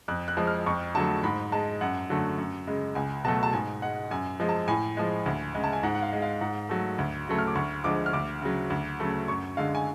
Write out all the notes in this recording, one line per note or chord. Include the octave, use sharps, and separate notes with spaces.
F2 F#6
F#6
F3 G#3
F6
F2 C#6
D3 F#3 A3 A5
G#2 B5
G#3 A5
F#2 F#5
D3 F#3 A3
F#2
C#3 G#3
C#2 G#5
B2 F#3 A3 A5
A5
G#2 G#5
G#3 F#5
F#2 G#5
F3 G#3
A5
A2 G#5
F3 G#3
D2
C#3 G#3
A5
G#5
G#2 F#5
F#5
F5
G#3
F5
G#2 F#5
F#3 A3
D2
C#3 F#3 A3
F6
D6
D2 C#6
D3 F3 G#3 D6
F6
D2 D6
C#3 F#3
D2
C#3 F#3 A3
F#2 C#6
D3 G#3 F5
G#5